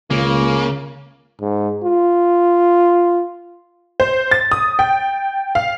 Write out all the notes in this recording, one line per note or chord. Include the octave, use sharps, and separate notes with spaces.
C#2 C#3 A#3
G#2
F4
C5
A6
D#6
G5
F5